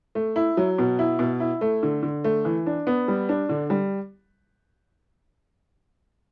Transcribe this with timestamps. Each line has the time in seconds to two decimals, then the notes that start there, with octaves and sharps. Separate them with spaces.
0.15 A3
0.36 E4
0.57 F#3
0.78 B2
0.99 E4
1.19 B2
1.40 E4
1.61 A3
1.83 D3
2.03 D3
2.24 A3
2.45 E3
2.66 D4
2.87 B3
3.08 G3
3.29 D4
3.49 D3
3.70 G3